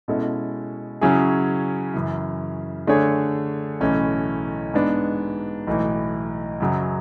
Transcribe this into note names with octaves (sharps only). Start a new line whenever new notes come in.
B2 G#3 C#4 E4 A4
C#3 F#3 C#4 E4 G#4
F#2 C#3 E3
D3 A3 D4 G#4 C#5
B1 A2 E3 A3 C#4
G#2 G#3 B3 D4
B1 A2 E3
F#2 C#3 F#3